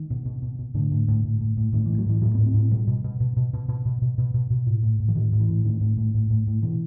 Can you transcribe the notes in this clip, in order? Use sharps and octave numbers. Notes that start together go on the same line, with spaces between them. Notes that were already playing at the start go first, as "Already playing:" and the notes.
Already playing: D#3
B2
B2
B2
B2
A2 D3
A2
A2
A2
A2
A2
A2 D#3
A2 E3
F#3
A2 E3
A2 F#3
A2 B3
C4
A2
C4
B2 G3
B2
B2
B2
B2
B2
B2
B2
B2
B2
B2
B2
A2
A2
A2
E3
A2 D#3
A2
E3
A2
A2 D#3
A2
A2
A2
A2
A2
B2 E3